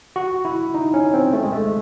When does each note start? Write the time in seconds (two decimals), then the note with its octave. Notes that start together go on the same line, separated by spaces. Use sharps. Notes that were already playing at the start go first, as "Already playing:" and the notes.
0.16 F#4
0.45 E4
0.74 D#4
0.94 C#4
1.14 C4
1.33 A3
1.43 G#3
1.52 A3